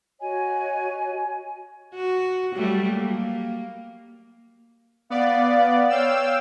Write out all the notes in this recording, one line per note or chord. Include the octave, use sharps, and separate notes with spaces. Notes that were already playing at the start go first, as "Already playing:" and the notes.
F#4 C#5 D#5 G#5
F#4
F#3 G3 A3
A#3
B3 D5 F5
C#5 F5 G5 E6